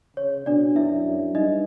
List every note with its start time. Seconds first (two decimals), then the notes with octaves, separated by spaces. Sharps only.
0.17 C#3 C#5
0.46 B2 D4 D5
0.76 F#2 E4 E5
1.05 F#2
1.35 G2 D#4 D#5